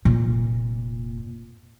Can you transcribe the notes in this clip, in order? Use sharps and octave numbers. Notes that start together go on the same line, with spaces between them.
F1 A#2